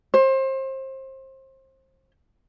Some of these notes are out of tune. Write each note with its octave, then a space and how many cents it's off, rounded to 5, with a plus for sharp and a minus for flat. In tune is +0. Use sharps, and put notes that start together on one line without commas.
C5 +30